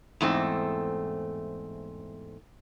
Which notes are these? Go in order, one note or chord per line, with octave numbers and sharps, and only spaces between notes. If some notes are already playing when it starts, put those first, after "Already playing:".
E2 G#2 A3 C4